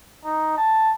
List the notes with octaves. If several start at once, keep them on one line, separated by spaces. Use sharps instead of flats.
D#4
A5